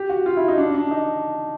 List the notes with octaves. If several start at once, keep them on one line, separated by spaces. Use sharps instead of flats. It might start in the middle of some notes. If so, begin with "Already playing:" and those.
Already playing: G4
F#4
F4
E4
D#4
D4
D4
D#4